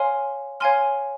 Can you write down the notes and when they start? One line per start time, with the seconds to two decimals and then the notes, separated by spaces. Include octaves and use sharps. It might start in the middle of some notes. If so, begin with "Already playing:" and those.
Already playing: C#5 F5 G#5 C6 F6
0.60 C#5 F5 G#5 C6 F6